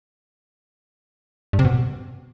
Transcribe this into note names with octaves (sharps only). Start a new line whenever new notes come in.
G2
C3
B2